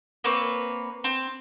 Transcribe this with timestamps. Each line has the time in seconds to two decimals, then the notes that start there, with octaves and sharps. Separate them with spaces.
0.24 A#3 C4 B4 C#5
1.04 C4